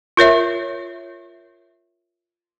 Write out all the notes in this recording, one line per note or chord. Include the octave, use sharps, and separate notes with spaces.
F4 A#4 C#5 E5